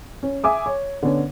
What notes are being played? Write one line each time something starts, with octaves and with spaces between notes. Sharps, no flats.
C#4
E5 G#5 D6 D#6
C#5
D3 B3 C#4